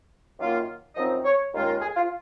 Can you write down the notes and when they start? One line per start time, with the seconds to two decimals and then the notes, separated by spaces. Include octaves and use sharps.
0.39 F#2 D#3 A#3 F4
0.96 F#2 F3 C4 D#4 D#5
1.25 C#5
1.53 D#2 D#3 G#3 C#4 F4
1.67 A#4
1.82 G#4
1.96 F4